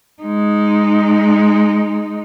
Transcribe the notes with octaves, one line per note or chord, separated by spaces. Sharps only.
G#3 D#4